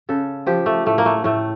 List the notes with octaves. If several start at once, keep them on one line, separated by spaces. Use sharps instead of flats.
C#3 A4
F3 G4
A3
A2 A3
A#3
A3
A2 A3